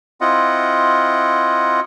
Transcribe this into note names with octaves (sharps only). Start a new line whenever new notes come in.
C4 E4 F4 D#5 F#5